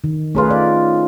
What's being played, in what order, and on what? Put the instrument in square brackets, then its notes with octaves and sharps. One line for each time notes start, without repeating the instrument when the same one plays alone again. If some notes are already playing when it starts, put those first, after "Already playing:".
[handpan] D#3
[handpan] A3 G#4 B4 [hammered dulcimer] C#4 D#4 F4
[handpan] D5